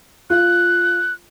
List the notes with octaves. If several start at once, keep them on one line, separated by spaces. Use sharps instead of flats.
F4 F#6